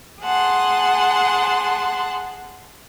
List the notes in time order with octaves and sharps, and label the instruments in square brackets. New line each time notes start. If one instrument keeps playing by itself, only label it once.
[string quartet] G#4 F#5 A5 C6